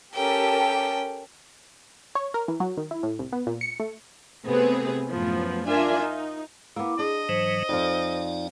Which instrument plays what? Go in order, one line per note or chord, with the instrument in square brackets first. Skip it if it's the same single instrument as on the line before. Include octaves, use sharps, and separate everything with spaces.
[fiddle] C#4 G5 [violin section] G4 A4 A#4
[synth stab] C#5
A#4
E3
F#3
D#3
E4
A2
C2
B3
A#2
C#7
A3
[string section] C3 A3 B3 C4 G#4 B4
F#2 A2 F3 B3
D4 F4 A#4 E5 G#5
D#4
[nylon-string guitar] A#3 B3 [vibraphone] E4 D6
[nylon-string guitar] D4 [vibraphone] G#4 [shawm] D#5
[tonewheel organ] G#2 E3 F#3 [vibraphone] C5
[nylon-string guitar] F2 F3 [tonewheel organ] D#4 D5